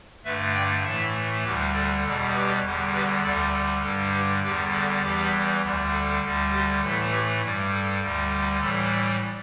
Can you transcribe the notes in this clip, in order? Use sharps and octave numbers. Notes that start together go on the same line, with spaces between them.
G2 D3 A3 B4 E5
D5 G5
A2 E3 A3 E5 A5
D2 D3 G3 G4 B4
A4 D5
E2 B2 G3 A4
G4 B4
E2 D3 G3
G4 B4
D2 D3 G3 A4 D5
A4
G2 D3 G3 A4
G4 B4
E2 D3 G3 G4 B4
A4 D5
E2 E3 G3 G4 B4
D2 D3 G3
A4
D2 D3 G3
G4
A2 E3 A3 A4
G4 B4
G2 G3
A4
D2 D3 G3
A2 E3 G3 A4 D5
D5 G5